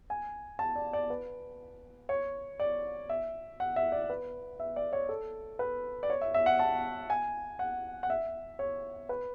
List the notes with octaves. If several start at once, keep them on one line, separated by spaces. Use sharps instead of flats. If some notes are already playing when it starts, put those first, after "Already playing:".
G#5
A5
D5
D5
B4
C#5
D5
E5
F#5
E5
D5
B4
E5
D5
C#5
A4
B4
D5
C#5
E5
E5
F#5
A5
G#5
F#5
F#5
E5
C#5
B4